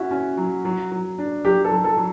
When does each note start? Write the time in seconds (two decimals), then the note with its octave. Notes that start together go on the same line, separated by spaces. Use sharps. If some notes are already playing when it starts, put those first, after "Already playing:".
Already playing: C#4 E4 F#4
0.11 C#4
0.37 F#3
0.65 F#3
0.91 F#3
1.18 D4
1.45 F#3 G4
1.65 A4
1.72 F#3
1.84 A4
1.97 F#3